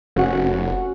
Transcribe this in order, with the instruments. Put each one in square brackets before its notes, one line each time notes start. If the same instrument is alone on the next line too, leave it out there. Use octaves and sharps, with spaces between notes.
[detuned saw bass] F1 [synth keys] C#4 F#4 F#5